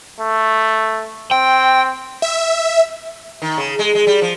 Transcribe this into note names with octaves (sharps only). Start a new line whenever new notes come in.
A3
C4 G5
E5
D#3
C#3
G#3
G#3
G3
F3